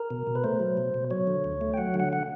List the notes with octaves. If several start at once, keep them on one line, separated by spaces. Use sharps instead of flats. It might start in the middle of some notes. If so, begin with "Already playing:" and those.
Already playing: A#4
B2
B2
B4
A3 C5
F#3
B2
B2
F#3 C#5
D3
D2
A3
G5
F#3 F#5
D3
F#5
F#5